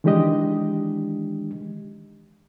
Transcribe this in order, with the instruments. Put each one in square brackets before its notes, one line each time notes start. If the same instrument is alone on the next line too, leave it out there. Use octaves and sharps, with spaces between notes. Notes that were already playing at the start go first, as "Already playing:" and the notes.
[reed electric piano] D#3 E3 G#3 D4 G4 D#5